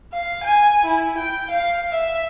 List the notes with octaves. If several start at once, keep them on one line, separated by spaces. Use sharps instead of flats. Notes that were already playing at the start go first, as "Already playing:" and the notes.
F5
G#5
E4
G5
F5
E5